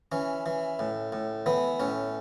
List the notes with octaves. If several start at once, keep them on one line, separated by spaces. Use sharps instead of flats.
E3 C#4
E3
A2
A2
E3 B3
A2 C#4